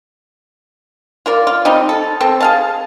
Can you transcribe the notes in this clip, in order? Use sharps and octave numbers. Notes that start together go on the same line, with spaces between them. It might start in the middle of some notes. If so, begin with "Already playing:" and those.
F4 A#4 D5
F4
G3 C4 D#4
A4
C4 A4
G#4 F5 A5